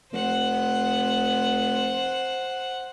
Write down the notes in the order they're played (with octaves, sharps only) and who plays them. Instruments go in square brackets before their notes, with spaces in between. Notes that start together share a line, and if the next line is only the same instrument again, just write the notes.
[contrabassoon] F1 [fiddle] C5 F#5